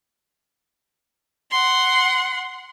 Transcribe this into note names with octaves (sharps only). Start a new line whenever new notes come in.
F#5 C6